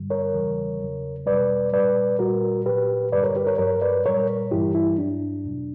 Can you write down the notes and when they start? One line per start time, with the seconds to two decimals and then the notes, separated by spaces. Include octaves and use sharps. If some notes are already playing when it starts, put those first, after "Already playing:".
Already playing: G2 D3 G3
0.10 A#4 C#5
0.34 E2 C#3 E3 G3
0.81 E2 C#3 F#3
1.26 E2 B2 G3 B4 D5
1.73 A#2 G3 B4 D5
2.19 A#2 G3 F#4 A#4
2.66 A#2 F#3 G4 B4
3.12 G2 D3 G3 B4 D5
3.23 A#4 C#5
3.35 G4 B4
3.47 A#4 C#5
3.58 G2 F#3 A#4 C#5
3.82 B4 D5
4.05 A#2 G3 A#4 C#5
4.51 G2 E3 G3 E4 G4
4.74 E4
4.98 G2 F#3 D4
5.44 E2 B2 F#3